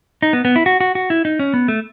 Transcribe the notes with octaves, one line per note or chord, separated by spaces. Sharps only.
D#4
B3
B3
E4
F#4
F#4
F#4
E4
D#4
C#4
B3
A3